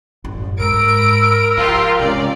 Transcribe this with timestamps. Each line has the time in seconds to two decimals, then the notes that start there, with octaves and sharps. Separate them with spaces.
0.25 A1 F#2
0.60 G#2 A#4 B5 E6 D7
1.57 F3 F4 G4
1.99 C3 G#3 C#4 D5